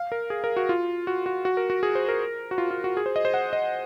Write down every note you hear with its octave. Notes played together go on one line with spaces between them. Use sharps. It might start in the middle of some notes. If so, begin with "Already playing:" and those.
Already playing: F5
A#4
G#4
A#4
F#4
F4
F#4
F#4
F#4
A#4
F#4
G#4
C5
A#4
F#4
F4
F4
F#4
G#4
C5
D#5
C5
F#5
D#5